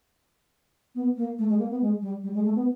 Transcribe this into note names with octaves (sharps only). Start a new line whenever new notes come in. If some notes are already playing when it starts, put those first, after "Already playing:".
B3
A#3
A3
G#3
A#3
B3
G#3
G3
G3
G#3
A3
B3